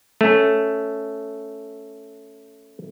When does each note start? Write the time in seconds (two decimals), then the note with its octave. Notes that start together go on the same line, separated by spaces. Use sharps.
0.21 A3 C#4